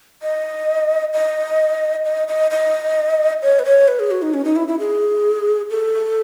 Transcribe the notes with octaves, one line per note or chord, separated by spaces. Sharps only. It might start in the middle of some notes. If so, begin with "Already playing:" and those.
D#5
D#5
D#5
D#5
D#5
C#5
B4
C#5
B4
G#4
F#4
D#4
C#4
D#4
E4
E4
G#4
A4